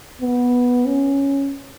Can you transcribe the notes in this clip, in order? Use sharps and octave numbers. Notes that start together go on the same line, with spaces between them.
B3
C#4